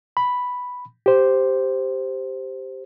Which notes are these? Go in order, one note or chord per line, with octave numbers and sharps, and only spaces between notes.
B5
G4 C5